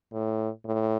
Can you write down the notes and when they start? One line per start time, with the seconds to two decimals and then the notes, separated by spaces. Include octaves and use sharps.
0.12 A2
0.65 A2